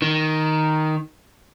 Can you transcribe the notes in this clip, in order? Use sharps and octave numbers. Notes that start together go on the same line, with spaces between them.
D#3